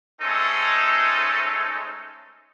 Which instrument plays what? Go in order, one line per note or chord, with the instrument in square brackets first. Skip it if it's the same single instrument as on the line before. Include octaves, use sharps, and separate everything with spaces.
[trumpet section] G#3 A3 C4 C#4 D#4 A4